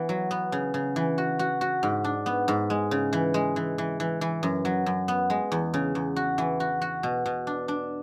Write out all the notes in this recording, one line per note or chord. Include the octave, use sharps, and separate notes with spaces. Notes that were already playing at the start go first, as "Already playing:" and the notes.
Already playing: E3 B3
F#3
B3
C#3
C#3
E3
F#4
F#4
F#4
G#2
D4
B3
G#2
G#3
C#3
E3
G#3
E3
E3
E3
E3
F#2
F#3
F#2
B3
G#3
E2
C#3
E2
F#4
E3
F#4
F#4
B2
B2
D4
D4